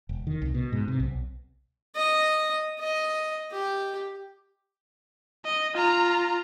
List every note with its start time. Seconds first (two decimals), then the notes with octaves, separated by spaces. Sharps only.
0.09 E1
0.27 D#3
0.42 C2
0.54 B2
0.73 G#2
0.88 C3
1.00 B1
1.96 D#5
2.80 D#5
3.52 G4
5.45 D#5
5.75 F4 A#5